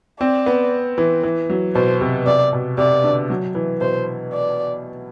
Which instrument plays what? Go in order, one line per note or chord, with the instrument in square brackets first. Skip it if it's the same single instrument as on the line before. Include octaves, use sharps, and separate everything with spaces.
[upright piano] C4 [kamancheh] D5
[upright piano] B3
E3
E3
F#3
[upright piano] B2 [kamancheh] C5
[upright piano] C3
[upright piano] C3 [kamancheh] D5
[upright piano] B2
[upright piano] C3 [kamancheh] D5
[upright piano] D3
F#3
E3
[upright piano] B2 [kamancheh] C5
[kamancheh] D5